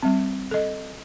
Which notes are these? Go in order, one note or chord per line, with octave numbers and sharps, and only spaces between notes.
G3 C4
A4 D#5